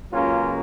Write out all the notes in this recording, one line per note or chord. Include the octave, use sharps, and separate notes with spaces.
C#2 C#3 F#3 A#3 C#4 F4